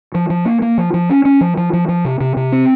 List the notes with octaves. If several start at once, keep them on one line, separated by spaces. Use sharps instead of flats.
F3
F3
A#3
A#3
F3
F3
C#4
C#4
F3
F3
F3
F3
C3
C3
C3
C4